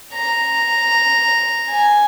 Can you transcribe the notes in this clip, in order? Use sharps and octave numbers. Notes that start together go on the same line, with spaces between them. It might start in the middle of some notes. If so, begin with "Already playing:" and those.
A#5
G#5